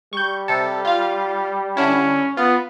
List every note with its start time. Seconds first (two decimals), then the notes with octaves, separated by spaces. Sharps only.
0.13 G3 C#6 G6
0.48 C3 A4
0.85 F4 F5
1.77 D3 C#4 D4 E4
2.37 B3 F4